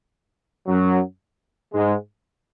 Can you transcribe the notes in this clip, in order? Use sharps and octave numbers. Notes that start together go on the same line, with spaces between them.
F#2 F#3
G#2 G#3